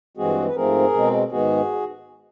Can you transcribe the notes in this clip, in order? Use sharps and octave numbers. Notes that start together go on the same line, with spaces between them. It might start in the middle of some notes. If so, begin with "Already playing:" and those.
G2 E3 G#3 C4 F#4 G#4
B4
G#2 F3 A3 C4 G#4 A#4
B2 G#3 C4
G#2 D#3 G#3 B3 F#4 G#4